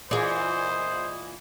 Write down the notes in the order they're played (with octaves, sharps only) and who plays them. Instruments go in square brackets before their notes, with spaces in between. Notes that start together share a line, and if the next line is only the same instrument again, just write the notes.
[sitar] A#2 E3 [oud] G#4 D5 [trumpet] C5 [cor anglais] D#5